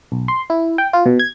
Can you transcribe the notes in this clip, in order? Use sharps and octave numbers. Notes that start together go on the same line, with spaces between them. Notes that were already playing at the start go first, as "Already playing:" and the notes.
B1
C6
E4
G5
F4
B2
G#6